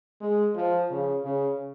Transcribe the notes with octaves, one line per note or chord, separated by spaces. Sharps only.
G#3
F3
C#3
C#3